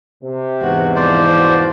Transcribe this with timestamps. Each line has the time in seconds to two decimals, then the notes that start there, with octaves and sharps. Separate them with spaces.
0.24 C3
0.62 E2 G#2 E3 F#4
0.96 F3 C5 D5
1.38 C#2 F#4